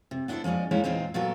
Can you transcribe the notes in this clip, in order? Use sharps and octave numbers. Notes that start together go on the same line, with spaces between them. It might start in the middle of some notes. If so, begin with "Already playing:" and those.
C3
B3 D4 E4 F4 A4 C5
F3 G#3 C#4 D5 D#5
G3 G#3 A#3 C#4 D#4 E4
E2 A#2 C4 D#4 C5
A#2 F#3 A3 B3 A4 A#4